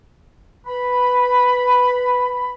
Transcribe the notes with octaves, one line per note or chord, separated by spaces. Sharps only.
B4 B5